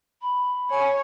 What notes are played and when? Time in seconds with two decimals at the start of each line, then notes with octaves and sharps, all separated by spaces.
0.21 B5
0.71 C#5 G#5